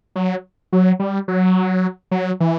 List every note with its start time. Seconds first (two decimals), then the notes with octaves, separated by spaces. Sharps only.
0.16 F#3
0.73 F#3
1.00 G3
1.28 F#3
2.11 F#3
2.40 E3